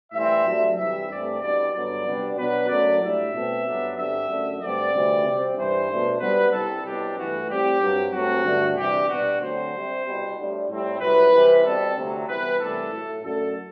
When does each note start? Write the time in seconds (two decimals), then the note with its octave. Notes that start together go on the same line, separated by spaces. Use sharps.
0.13 A2 E3 G3 C4 E5
0.46 C3 F#3 A3 D4
0.77 C2 C3 E3 G3 E5
1.09 G2 E3 A3 C4 D5
1.41 C2 B2 G3 D4 D5
1.73 G2 D3 F#3 B3 D5
2.04 C3 G3 B3 D4
2.37 B2 F#3 B3 D4 B4
2.68 F#2 F#3 A3 D5
3.01 A2 G3 D4 E5
3.33 B2 A3 C4
3.65 G2 F#3 B3 D4
3.97 G2 D3 G3 C4 E5
4.28 F#2 D3 A3 D4
4.61 G2 D3 A3 C4 D5
4.93 D2 C3 E3 G3 C4
5.25 C3 G3 C4
5.56 G2 E3 G3 C5
5.89 B2 A3 D4
6.20 C3 G3 B3 D4 B4
6.52 C2 C3 G3 A4
6.84 C2 B2 F#3 B3 D4 G4
7.16 G2 E3 A3 F#4
7.48 A2 G3 C4 G4
7.81 G2 F#3 C4
8.12 G2 F#3 A3 C4 F#4
8.44 G2 D3 A3 D4
8.76 C3 E3 G3 D4 G4
9.07 B2 G3 D4 F#4
9.40 D2 D3 F#3 C4 C5
9.72 C3 G3 C4
10.04 C2 B2 G3
10.36 A2 G3 D4
10.68 A2 G3 C4
11.00 C2 C3 F#3 B4
11.32 C2 C3 E3
11.64 B2 G3 C4 A4
11.96 D2 C3 F#3
12.27 C2 C3 E3 B3 B4
12.60 C2 C3 E3 A3 D4 A4
12.91 A2 F#3 A3
13.23 F#2 D3 A3 A4